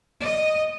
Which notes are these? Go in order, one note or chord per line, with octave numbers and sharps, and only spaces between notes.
D#5